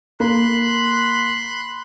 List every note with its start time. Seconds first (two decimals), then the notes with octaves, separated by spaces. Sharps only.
0.20 A#3 B5 C6 F#6